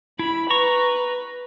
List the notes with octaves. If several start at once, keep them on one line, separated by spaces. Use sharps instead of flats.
E4 B5
B4 A#5 C#6